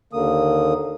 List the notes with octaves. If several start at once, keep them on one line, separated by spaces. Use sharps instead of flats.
D#2 D3 A#3 D#6